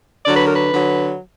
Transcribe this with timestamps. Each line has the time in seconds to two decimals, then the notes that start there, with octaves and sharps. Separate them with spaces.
0.25 D3 F#3 D5
0.36 B4
0.45 A#4
0.55 B4
0.71 D3 F#3